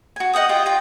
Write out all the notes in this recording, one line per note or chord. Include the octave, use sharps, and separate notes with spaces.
F#4 G#5
D#5 F#5 G5 D#6
F4 G4 D#5 G5
F4 G5